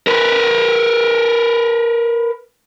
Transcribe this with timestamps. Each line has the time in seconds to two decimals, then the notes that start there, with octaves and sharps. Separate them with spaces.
0.07 A#4 B4